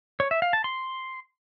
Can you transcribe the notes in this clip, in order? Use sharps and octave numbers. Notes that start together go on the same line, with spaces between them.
C#5
E5
F5
A5
C6